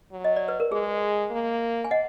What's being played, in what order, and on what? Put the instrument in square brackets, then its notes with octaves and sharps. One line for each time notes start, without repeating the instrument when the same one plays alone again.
[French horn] F#3
[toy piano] D#5
D5
B4
A#4
[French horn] G#3 [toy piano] G#4
[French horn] A#3
[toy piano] G#5
D#5 F#5